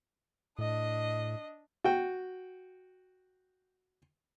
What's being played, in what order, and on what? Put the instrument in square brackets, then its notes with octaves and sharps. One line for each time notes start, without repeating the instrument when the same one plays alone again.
[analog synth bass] A2 [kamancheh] D4 D#5
[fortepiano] F#4 G5